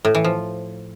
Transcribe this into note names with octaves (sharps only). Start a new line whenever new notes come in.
A2
E3
F3